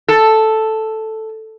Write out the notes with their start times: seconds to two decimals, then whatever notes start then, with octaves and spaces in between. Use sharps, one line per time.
0.08 A4